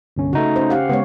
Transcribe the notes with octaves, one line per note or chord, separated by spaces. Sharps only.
G1 C2 C#4
C#3 A3 D#4 F#4
C#4 C5
G4 F5 F#5
C#3 G#3 B3 C#5